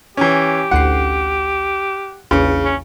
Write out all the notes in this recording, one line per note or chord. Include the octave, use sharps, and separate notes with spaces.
E3 C#4 G4
A1 D2 F#5 C7
A#1 E2 C#3 C#7
C#4